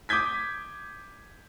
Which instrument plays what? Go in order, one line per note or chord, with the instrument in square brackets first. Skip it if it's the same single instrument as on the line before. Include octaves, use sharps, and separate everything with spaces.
[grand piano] D6 D#6 G6 G#6 B6